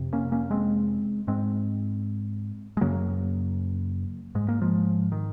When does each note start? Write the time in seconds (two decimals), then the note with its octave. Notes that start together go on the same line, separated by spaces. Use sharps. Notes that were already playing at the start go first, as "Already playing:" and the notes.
Already playing: F2 C3
0.13 A#3 C#4
0.32 A#3 C#4
0.51 G#3 C4
1.27 G#2 G#3 C4
2.77 G#3
2.81 F#2 C#3 F#3 A#3
4.35 G#2 G#3
4.48 A#3
4.62 F3 G#3
5.12 D#3